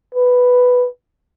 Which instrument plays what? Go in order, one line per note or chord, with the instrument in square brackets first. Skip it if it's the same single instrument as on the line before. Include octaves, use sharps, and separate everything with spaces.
[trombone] B4